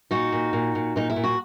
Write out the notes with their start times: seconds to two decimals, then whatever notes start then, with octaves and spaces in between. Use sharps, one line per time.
0.11 A#2 D#4 F#4
0.32 A#2
0.53 A#2
0.75 A#2
0.96 A#2 D#4
1.10 E4
1.16 A#2
1.24 F#4